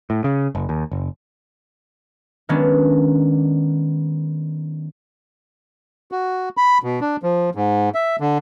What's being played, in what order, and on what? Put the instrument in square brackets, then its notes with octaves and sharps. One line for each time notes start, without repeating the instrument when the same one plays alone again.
[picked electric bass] A2
C#3
F#1
D#2
F#1
[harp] D#3 F#3 G#3 B3 C#4 D4
[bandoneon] F#4
B5
B2
D4
F3
G#2
E5
D3